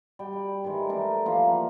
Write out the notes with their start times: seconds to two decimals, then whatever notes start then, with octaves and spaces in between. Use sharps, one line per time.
0.19 G3 G5
0.33 B5
0.64 D#3 E3 G3 G#3
0.89 A3 D4 A#4
1.25 E3 F3 A#3
1.45 F5 F#5 A#5